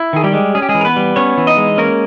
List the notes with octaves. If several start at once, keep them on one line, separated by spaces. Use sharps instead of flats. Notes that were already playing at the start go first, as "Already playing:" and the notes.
Already playing: E4
D#3 G#4
G3 G4
G#3
C#4 G#4
G4
G#3 G#4
E3
A#4
B3 B4
G3
B3 C#4 C#5
E3
D#4 D#5
G#3
A#3 C#4 A#4